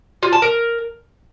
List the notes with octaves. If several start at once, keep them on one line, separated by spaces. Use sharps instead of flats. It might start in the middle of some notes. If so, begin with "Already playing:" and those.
F4
A5
A#4